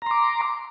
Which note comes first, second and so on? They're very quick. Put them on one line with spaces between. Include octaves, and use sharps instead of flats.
A#5 C6 D6